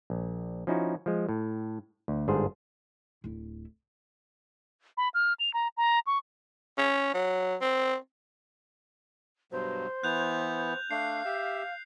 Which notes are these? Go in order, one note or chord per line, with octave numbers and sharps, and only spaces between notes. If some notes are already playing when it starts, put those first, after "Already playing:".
A#1
F3 C#4 D#4 E4 F#4
F3 G#3
A2
D2
G1 G#2 D4 G#4 C5
D1 E4
B5
F6
F7
A#5
A#5
C#6
C#4
F#3
C4
G2 B2 F#3 C5
E3 B3 F#6 G6 F7
A3 D4 F5 C7
G4 E5